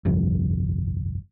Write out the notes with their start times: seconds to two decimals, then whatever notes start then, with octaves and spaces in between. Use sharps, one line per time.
0.05 G1 C2 F2